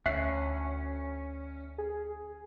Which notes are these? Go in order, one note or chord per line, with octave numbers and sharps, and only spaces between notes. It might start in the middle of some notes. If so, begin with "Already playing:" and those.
D2 C#4 E5 F#6 C7
G#4